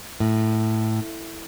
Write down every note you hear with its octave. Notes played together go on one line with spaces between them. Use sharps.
A2